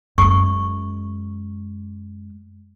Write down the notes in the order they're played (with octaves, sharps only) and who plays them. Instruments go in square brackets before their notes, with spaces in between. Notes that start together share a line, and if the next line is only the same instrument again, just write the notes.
[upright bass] F#2 G#3 [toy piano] C#6